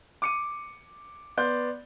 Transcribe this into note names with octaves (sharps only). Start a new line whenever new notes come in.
D6 C#7 D#7
B3 D5 C6 G6